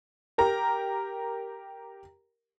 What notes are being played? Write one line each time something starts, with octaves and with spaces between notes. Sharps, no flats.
G4 A#4 A#5